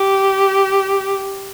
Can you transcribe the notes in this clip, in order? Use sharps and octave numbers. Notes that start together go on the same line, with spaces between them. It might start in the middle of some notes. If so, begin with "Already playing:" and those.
Already playing: G4